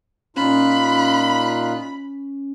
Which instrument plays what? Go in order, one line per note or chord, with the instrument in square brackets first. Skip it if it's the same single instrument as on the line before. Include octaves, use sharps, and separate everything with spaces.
[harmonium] A#2 D#4 [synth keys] C#4 [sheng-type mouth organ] F4 F#6 [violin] B5